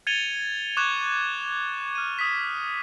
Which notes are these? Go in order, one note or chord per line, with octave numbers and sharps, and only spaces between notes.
G#6 A6 C#7 D#7 F7 G7
C#6 D6 F#6 G#6 E7 G7
F6 D#7
D#6 B6